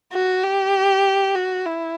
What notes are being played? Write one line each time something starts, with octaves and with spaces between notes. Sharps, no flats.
F#4
G4
F#4
E4